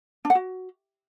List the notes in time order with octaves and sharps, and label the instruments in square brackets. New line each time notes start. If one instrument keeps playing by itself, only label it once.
[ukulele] D4
F#5
F#4